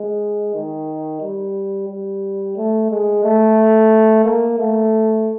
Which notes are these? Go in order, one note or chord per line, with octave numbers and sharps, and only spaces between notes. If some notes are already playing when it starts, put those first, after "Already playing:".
Already playing: G#3
D#3
G3
G3
A3
G#3
A3
A#3
A3